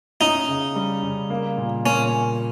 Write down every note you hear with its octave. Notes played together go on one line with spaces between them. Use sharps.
C#4 D#4
C#3
G3
C#3
A#3
A#2
A#2 C#4